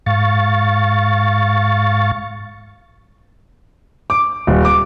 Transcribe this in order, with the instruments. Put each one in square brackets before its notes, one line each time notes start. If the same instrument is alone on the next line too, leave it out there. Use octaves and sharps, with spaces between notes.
[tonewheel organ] G#2 F5 C#6 A6
[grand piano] D6
D#1
D6